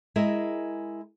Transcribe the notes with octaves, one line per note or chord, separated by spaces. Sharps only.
G#3 E4 G#4 A#4 E5